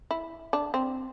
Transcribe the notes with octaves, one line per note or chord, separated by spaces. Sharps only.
E4
D4
C4